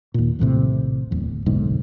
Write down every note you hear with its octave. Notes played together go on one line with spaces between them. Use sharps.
D#2 A#2
A#1 D#2 A2 C3
D1 E2
F#1 B1 G#2 D3